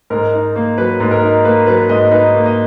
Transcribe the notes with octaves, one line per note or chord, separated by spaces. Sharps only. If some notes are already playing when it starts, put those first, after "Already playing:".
G#2 A#4
D#4
A#3
F#3 B4
G#2
A#4
D#4
A#3 B4
F#3 B4
G#2 D#5
D#4 B4
A#3
D#5